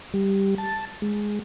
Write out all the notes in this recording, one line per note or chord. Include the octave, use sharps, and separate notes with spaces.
G3
A5
G#3